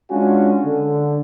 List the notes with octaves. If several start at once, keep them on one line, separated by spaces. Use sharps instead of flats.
G#3 C#4 D4 F4 F#4 G#5
D3